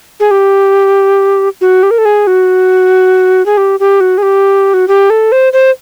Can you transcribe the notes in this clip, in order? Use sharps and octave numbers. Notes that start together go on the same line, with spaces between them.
G#4
G4
F#4
G4
A#4
A4
G#4
F#4
G#4
G4
G4
F#4
G#4
G4
F#4
G4
A4
C5
C5